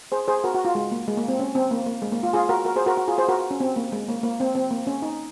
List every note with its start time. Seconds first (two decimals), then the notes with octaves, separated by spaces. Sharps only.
0.12 G#4 C5
0.28 G#4 C5
0.44 F#4 A#4
0.55 F#4
0.65 F4
0.75 G#3
0.92 A#3
1.08 G#3
1.17 A#3
1.28 C4
1.39 C#4
1.55 C4
1.71 A#3
1.86 A#3
2.02 G#3
2.12 A#3
2.23 F4
2.33 F4 G#4
2.49 F#4 A#4
2.65 F#4 A#4
2.76 G#4 C5
2.86 F#4 A#4
2.97 F#4
3.08 F4 G#4
3.18 G#4 C5
3.28 F#4 A#4
3.51 C#4
3.60 C4
3.76 A#3
3.92 G#3
4.09 A#3
4.23 A#3
4.40 C4
4.55 C4
4.71 A#3
4.87 C#4
5.02 D#4